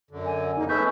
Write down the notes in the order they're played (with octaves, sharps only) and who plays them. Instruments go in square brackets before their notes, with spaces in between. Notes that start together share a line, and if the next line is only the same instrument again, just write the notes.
[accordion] F#2 D3
[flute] G#5
[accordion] F2 C#3 A#3 [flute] D#4
[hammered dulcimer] G#3 A3 B3 [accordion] C#4 E5 [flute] G6